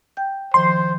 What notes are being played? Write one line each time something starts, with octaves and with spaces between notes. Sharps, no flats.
G5 G6
D#3 F3 C5 C6